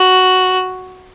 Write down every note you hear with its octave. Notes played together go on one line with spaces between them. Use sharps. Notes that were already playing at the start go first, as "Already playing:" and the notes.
Already playing: F#4